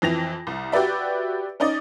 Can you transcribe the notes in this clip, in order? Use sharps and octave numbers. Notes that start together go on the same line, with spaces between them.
F2 E3 A#6 F7
C2
F#4 G4 B4 D5 E5
C#4 D#4 D5 D#5